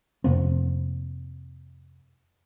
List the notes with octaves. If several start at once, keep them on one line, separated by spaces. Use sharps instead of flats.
F2 C3 A#3 C4